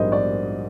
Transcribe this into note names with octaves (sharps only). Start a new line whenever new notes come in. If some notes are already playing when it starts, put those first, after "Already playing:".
Already playing: A#1 G#2 G3 A#4 C5 D#5
D5